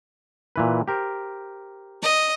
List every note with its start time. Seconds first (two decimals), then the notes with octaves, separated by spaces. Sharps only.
0.56 A#2 E3 B4
0.88 G4 A#4 C5
2.03 D#5